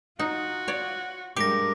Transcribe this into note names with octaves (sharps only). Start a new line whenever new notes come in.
D#4 F4 F#4
C#5 D5
G2 G#3 G4 A#4 D6 A#6